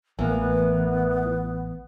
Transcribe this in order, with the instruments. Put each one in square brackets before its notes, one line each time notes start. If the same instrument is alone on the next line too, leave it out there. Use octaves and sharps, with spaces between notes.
[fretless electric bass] A1 [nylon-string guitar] E3 A#3 [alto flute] B3